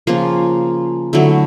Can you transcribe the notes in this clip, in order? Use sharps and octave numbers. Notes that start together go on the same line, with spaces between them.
C#3 F3 A#3 F4
D3 F#3 A3 E4